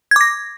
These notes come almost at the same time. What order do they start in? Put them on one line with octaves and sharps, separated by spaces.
G#6 D6 A#6